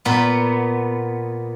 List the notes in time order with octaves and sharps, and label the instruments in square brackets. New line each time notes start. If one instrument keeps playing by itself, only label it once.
[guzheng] A#2 B3